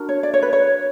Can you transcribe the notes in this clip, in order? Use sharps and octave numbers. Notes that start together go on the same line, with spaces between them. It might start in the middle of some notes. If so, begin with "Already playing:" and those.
Already playing: D4 F#4 A#4
C#5
D5
C#5
B4
C#5